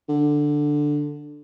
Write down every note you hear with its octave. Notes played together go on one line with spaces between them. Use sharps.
D3